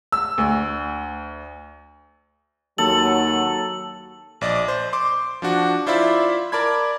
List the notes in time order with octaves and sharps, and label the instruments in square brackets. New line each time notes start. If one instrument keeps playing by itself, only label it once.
[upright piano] E6
D2
[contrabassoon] D#2 [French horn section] F#3 [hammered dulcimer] A4 [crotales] F#7
[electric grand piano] A#1 D5 D#5
C5
C6 D6
F3 D4 F#4
E4 F4 C5 D5 E5 B5
A#4 D5 A5 B5 G#6